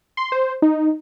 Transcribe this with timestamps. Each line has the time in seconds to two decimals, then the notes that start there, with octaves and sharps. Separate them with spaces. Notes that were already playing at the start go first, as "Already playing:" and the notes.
0.17 C6
0.32 C5
0.62 D#4